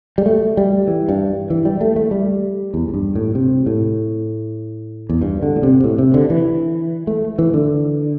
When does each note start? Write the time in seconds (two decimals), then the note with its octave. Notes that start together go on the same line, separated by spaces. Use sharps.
0.18 G3
0.26 A3
0.57 G3
0.88 E3
1.09 G2
1.50 E3
1.65 G3
1.81 A3
1.96 A3
2.11 G3
2.74 E2
2.89 E2
2.94 G2
3.15 A2
3.35 C3
3.66 A2
5.09 E2
5.22 G2
5.43 D3
5.56 A2
5.63 C3
5.84 A2
5.98 C3
6.14 D3
6.30 E3
7.07 A3
7.39 E3
7.54 D3